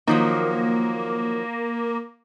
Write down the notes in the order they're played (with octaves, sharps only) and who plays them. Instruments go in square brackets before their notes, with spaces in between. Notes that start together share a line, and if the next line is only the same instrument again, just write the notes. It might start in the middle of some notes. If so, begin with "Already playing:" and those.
[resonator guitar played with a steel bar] D#3 F3 F#3 [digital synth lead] A#3